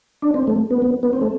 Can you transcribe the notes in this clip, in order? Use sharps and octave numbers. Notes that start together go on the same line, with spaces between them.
D4
C4
A3
B3
B3
B3
C4
A3